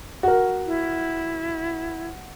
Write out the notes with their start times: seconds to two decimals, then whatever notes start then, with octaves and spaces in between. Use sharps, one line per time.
0.23 F#4 A#4
0.66 E4